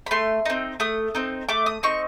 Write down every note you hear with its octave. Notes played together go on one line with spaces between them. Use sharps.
B5
A3 C6
C4 D#4
A3 D#6
C4 D#4
A3 D6
D#6
C4 D#4 C#6